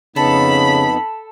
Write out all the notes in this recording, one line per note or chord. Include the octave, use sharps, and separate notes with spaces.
F2 C#3 B3 D#4 A4 B5